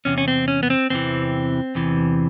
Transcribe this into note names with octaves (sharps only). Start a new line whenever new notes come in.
E2 C3 C#4
C#4
C4
C#4
B3
C4
E2 C3 E3 C4
E2 C3 E3